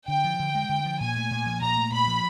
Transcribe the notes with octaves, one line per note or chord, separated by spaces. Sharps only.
D3 G5
F3
D3
G#3
D3
F3
A#2 G#5
A3
A#2
F3
A#2 A#5
A3
A#2 B5
F3